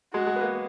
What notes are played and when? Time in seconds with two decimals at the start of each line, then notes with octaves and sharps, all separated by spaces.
0.14 G#3 F#4
0.27 G#3
0.36 B3
0.41 A#3